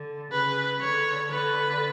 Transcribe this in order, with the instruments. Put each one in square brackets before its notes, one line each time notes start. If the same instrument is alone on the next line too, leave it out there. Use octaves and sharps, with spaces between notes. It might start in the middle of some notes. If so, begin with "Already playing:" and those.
Already playing: [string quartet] D3
[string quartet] C#3 [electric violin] B4
[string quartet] D3 [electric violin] C#5
[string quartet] D3 [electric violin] B4